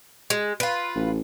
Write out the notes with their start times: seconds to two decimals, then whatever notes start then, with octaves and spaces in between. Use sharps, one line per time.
0.30 G#3
0.60 F4 B4
0.95 A1